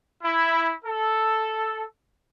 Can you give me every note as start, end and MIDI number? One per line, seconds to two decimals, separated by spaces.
0.23 0.72 64
0.85 1.84 69